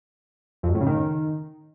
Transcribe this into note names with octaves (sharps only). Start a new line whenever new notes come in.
F2
F#2
A2
C#3
D#3